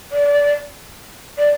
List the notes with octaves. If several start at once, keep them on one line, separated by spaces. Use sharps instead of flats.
D5
D5